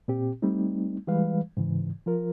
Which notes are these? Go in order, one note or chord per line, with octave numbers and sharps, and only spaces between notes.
A#2 C4 G4
G3 A3 C4 D#4
E3 G3 G#3 B4 F5
G#2 C#3 E3
F3 F4 A#4